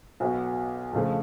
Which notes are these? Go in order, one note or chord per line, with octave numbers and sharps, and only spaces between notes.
B1 B2 F#3
F2 C#3 F3 A3